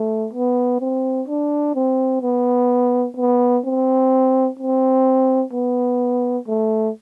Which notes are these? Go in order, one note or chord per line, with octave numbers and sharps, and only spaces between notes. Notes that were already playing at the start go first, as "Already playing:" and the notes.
Already playing: A3
B3
C4
D4
C4
B3
B3
C4
C4
B3
A3